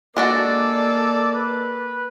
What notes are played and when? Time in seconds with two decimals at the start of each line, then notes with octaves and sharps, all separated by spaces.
0.17 G#3 A#3 D4 F#4 A4 D5
1.34 B4